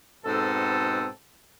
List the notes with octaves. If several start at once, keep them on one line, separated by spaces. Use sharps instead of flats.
G#2 B2 C4 A4